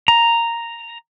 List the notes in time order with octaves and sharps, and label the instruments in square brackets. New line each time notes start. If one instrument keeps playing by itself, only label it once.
[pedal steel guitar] A#5